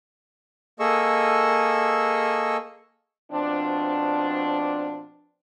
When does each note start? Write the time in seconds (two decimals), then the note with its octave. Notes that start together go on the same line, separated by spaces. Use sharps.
0.80 A#3 G#4 A4 D#5 C#6 E6
3.31 B2 F3 C4 D4